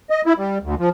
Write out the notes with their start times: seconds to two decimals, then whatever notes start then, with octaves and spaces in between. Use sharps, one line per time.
0.10 D#5
0.26 E4
0.38 G3
0.63 D2
0.79 F3